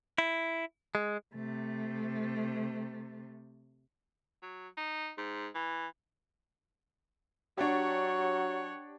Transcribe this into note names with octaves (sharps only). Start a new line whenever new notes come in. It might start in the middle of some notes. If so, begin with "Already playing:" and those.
E4
G#3
C3 A3
F#3
D#4
G#2
E3
F#3 D4 G4 C#5 F#5